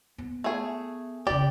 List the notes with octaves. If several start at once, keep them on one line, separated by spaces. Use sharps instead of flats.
B3
A3 G#4
E2 C#3 G4 D5